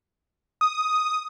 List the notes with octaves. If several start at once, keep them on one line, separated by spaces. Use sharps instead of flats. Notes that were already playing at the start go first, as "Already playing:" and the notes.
D#6